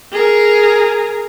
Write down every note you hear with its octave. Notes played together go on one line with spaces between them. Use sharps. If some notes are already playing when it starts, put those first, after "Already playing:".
G#4 A#4